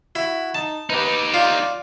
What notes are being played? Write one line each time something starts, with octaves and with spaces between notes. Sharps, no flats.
E4 F#4
D#4 A5
D#4 G4 B4
F4 D5